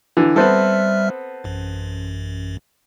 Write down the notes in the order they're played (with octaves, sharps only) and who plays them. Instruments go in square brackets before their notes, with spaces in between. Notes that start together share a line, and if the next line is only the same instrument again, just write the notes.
[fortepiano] D3 E3
[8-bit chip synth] G3 E5 F6 [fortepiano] B3 C4 A4
[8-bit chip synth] A1 F#2